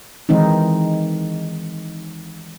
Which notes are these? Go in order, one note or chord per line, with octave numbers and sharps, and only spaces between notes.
D#3 E3 G#3 C4 D#4